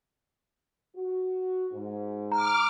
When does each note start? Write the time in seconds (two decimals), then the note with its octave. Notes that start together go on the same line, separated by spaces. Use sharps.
0.96 F#4
1.72 G#2
2.32 A#5 D6 F6